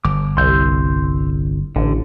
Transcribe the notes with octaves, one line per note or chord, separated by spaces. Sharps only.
G1 D6
C2 C6 E6 G6
A1 D3